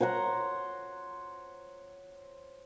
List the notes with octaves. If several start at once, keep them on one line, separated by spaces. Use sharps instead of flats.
C5 C#5 F#5 A#5